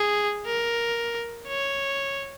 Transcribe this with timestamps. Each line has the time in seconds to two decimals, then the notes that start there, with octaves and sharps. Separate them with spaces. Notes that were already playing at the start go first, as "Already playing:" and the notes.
Already playing: G#4
0.46 A#4
1.47 C#5